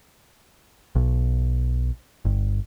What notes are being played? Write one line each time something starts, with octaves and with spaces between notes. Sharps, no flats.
B1
G1